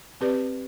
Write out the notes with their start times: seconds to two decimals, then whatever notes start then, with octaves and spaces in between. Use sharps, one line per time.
0.21 C4 G4 B4 D5